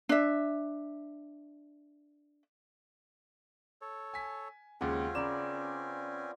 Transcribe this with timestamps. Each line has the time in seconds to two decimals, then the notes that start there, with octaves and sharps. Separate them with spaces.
0.09 D4 E5
3.82 A4 C#5
4.14 G#5 B6
4.81 D#2 C#3 G#3 C4 C#4 F4 F#5 G#5
5.15 C#3 A#4 B4 D5 E7